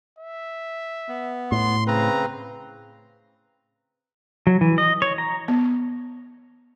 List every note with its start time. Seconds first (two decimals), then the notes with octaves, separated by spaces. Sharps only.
0.19 E5
1.09 B3
1.52 A2 C6
1.87 C#3 C4 B4 A#5
4.47 F#3
4.61 E3
4.78 D#5
5.02 C#5
5.18 A#5
5.48 B3